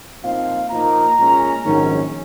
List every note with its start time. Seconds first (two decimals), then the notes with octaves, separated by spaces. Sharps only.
0.23 A#2 F3 C4 D#4 F5
0.70 A#2 F3 A#3 D#4 A#5
1.18 A#2 G#3 C#4
1.64 A#1 G#2 D#3 F#3 C#4